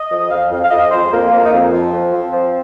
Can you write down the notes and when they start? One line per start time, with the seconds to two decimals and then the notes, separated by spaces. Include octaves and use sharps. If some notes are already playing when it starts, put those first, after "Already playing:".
Already playing: D#5
0.10 F2
0.30 F2 F5
0.51 F2 F5
0.63 F5
0.70 F2 D#5
0.91 F2 C5
1.04 G#3
1.11 F2 A#3
1.31 F2 A#3
1.44 D#4
1.52 F2 C4
1.72 F3
1.92 F2
2.13 F3
2.33 F3